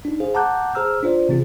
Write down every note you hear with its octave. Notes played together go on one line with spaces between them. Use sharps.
D4 D#4
G#4 C5 F5
F#5 A5 A#5 D6 F#6 G6
G#4 C5 A#5 E6 F6
D4 F4 C5 D5
C3 E3 C4 F4 G#4